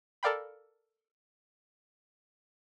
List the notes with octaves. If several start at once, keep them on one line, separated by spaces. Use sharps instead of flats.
A4 A#4 D5 F5 G5 B5